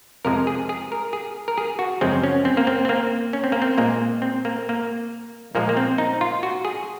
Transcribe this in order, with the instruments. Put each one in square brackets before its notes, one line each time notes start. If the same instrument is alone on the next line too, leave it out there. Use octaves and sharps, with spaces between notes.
[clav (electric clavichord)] F2 C3 F3 G#3 A#4
G#4
G#4
A#4
G#4
A#4
G#4
F#4
F#2 C#3 F3 G#3 C4
C#4
C4
A#3
C4
C4
A#3
C#4
C4
A#3
C4
A#2 G#3 A#3
C4
A#3
A#3
A#2 F3 G#3 A#3
A#3
C4
D#4
F4
F#4
G#4